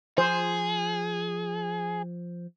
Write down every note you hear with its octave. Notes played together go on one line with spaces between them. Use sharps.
F3 G#4 C5